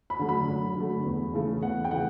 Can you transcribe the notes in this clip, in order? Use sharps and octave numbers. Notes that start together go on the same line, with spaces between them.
B5
D3 F#3 A3
B5
F#2
D3 F#3 A3
E2
C#3 E3 A3
E2 F#5
G5
C#3 E3 A3 F#5